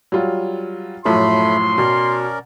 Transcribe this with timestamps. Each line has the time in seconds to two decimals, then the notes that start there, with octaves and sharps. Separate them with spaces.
0.12 F#3 G3 F4
1.05 F#2 A2 F3 A3 B5 C6
1.78 B2 C#4 A#4 D5